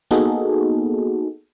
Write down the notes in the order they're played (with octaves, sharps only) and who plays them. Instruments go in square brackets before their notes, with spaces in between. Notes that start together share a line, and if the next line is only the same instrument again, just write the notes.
[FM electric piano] A#3 B3 D#4 F#4 G#4 A4